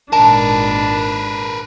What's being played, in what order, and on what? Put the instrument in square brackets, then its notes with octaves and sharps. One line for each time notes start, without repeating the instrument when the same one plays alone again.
[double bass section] G#1 A#2 D#3 [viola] D4 [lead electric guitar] A#4 B4 [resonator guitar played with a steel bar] A5